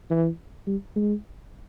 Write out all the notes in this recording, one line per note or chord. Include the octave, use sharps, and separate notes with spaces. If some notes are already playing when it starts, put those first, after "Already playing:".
E3
G3
G#3